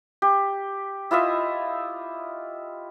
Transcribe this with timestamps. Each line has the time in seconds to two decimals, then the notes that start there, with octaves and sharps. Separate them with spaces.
0.22 G4
1.11 E4 F4 D#5 E5